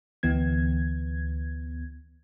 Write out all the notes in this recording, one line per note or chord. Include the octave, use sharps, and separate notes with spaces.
D2 E3 B3 G#6